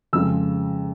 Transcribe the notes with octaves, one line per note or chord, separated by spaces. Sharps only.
F2 C#3 F3 G#3 E6